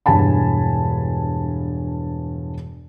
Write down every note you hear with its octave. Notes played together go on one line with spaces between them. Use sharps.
E1 G2 G#5 A5 B5